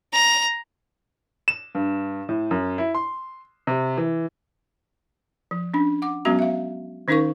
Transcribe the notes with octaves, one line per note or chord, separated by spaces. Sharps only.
A#5
E7
G2
A2
F#2
E4
C6
C3
E3
F3
C#4 D4
F#5 D6
F#3 G#3 B3 C#4 F#4 A#5
E5 F5
D#3 C#4 D#4 A#4 F5 C#6